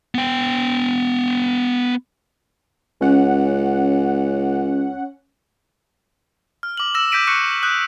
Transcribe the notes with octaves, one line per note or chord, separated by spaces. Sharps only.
B3 G5
C#2 C#4 F#5
F6
D6 F#7
E6 A#6 E7
D6 G6 A#6 B6 D7 D#7
C#6 F#6 A#6 C#7
D#6 F#6 G6